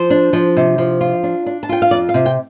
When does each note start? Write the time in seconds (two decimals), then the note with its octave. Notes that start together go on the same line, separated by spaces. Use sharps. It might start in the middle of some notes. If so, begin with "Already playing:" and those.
Already playing: F3 C5
0.10 D4
0.33 F3
0.57 C3
0.78 F3
1.01 F4
1.23 D4
1.46 D4
1.63 A5
1.69 F4 G5
1.82 F5
1.91 F2 D5
2.09 F5
2.14 C3
2.26 G5